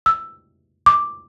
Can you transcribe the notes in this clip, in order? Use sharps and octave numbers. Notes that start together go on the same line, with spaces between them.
E6
D6